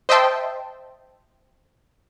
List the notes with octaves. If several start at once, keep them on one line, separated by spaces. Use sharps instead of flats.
C5 D#5 E5 G5 A5 C6